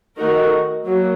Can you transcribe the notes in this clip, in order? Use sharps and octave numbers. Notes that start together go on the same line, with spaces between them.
D#3 A3 D#4 F#4 A#4
F#3 A#3